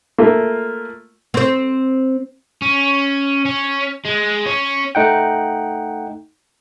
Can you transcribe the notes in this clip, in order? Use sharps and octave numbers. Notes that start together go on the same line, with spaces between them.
A3 A#3 F4
C4 C5
C#4
C#4
G#3
C#4
A3 D#4 F#5 G5